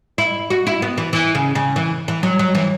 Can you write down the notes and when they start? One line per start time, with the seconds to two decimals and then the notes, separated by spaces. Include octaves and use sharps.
0.18 E4
0.50 F#4
0.67 E4
0.82 B3
0.98 E3
1.13 E3
1.35 C#3
1.55 C#3
1.76 E3
2.08 E3
2.23 F#3
2.39 F#3
2.55 E3